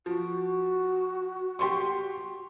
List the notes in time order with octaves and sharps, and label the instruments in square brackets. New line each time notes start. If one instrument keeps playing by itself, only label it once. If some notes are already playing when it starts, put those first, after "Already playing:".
[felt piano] F3 [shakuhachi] F#4
[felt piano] G4 C6 C#6